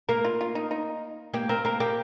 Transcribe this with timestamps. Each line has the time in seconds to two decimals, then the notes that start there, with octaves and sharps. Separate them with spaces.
0.09 A#3 A#4
0.25 F4
0.41 F4
0.55 D#4
0.71 D#4
1.34 A#3 G4
1.49 C4 A#4
1.65 A#3 A#4
1.80 A#3 G4